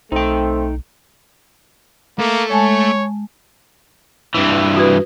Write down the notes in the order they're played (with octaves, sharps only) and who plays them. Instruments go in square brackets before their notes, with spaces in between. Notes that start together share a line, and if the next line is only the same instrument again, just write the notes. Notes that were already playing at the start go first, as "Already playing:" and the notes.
[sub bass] B1 [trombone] A3 [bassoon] C4 [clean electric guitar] D#4 G5
[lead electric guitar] A3 A4 [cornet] A#3
[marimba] G#3 G#5 A5 [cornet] C#5
[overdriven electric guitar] G2 E3
[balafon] F#4 B4